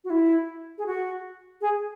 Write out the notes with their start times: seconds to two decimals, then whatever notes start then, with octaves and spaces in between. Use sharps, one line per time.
0.04 F#4
0.10 E4
0.78 G#4
0.86 F#4
1.61 G#4